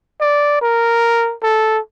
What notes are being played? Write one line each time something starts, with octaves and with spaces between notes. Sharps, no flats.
D5
A#4
A4